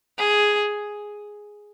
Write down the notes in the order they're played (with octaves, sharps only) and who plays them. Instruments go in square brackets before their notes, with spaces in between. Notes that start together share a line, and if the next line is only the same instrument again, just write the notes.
[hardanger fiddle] G#4